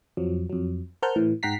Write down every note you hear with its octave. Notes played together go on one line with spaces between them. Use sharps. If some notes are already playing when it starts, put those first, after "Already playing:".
F2 F3 F#3
F2 F#3
A#4 C5 F#5 A5 F6 G6
A2 E3
G#2 F#5 G5 A#5 B6 C7